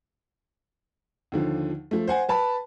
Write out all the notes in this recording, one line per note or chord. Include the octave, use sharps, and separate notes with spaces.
D#2 D3 F3
F3 A3
C5 F#5 G#5
B4 A5 B5